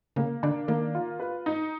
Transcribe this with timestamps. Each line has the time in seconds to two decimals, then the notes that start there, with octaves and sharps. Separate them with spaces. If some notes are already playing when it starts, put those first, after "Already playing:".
0.16 C#3 A#3
0.43 D3 D4
0.68 D#3 A#3
0.95 F4
1.20 B4
1.46 D#4